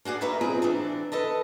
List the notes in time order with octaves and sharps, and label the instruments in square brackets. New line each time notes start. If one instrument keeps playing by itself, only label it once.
[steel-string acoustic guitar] A#3 F#4 G#4 D5
A3 A#3 D#4 A#4 B4 E5
B2 F3 C4 F4 G#4
E3 C4 D4
A4 B4 D#5 A5